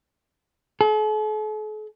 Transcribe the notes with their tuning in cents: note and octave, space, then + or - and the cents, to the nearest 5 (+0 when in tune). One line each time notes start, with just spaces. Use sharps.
A4 -45